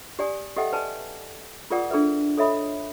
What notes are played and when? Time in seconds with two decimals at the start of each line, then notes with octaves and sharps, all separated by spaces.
0.19 G4 D5 G#5 D#6
0.57 G4 A4 D#5 E5 F#5 G5
0.73 B4 D5 G#5 A5
1.70 F4 G#4 A#4 D5 F#5 D#6
1.90 D4 G#4 A4 B4 E5
2.38 A4 C#5 D#5 E5 B5 D#6